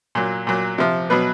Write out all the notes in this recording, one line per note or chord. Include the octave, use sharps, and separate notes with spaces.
A#2 F#3
A#2 F#3
C3 F3
B2 F#3 B4